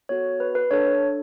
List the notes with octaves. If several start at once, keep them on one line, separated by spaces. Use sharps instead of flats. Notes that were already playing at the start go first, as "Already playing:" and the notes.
B3 F#4 A4 C#5
B4
B4
D4 A4 C#5